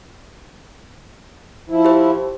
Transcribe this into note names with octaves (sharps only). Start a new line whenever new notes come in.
F3 E4
G4 C5